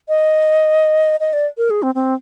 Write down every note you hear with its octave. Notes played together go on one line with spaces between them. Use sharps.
D#5
D#5
D5
A#4
G#4
C4
C4